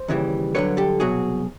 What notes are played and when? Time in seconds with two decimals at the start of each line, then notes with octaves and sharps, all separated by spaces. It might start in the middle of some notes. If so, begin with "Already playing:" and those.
Already playing: C5
0.08 D#2 C#3 E3 G3
0.55 G2 D3 F#3 B4 C#5
0.77 G4 A4
1.00 C2 B2 F#3 F#4 G#4